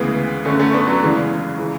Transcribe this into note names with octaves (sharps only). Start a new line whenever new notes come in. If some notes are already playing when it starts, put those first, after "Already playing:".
Already playing: D2 C#3 E3 G#3 B3
F#2 D3 A3 C#4
A3 C#4
B3 D4
F#3
E2 C#3 E3 G#3
C#3 E3